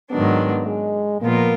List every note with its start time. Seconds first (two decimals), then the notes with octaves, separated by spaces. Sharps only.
0.11 G#2 D#3 F#3 B3 D4
0.66 G#3
1.21 A#2 F3 A#3 B3 F4 A#4